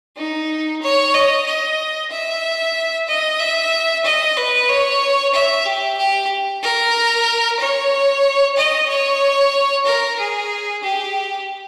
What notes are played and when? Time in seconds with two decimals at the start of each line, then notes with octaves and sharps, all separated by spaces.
0.17 D#4
0.82 C#5
1.14 D#5
1.46 D#5
2.11 E5
3.08 D#5
3.39 E5
4.04 D#5
4.37 B4
4.69 C#5
5.34 E5
5.66 G4
5.98 G4
6.63 A#4
7.60 C#5
8.56 D#5
8.89 C#5
9.85 A#4
10.18 G#4
10.83 G4